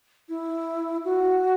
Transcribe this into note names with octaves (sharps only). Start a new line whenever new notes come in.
E4
F#4